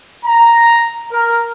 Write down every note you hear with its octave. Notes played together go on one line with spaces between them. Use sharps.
A#5
A#4